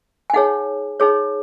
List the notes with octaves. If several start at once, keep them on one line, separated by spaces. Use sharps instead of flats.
G#5
D#4 G#4 C#5 F#5
D#4 G#4 C#5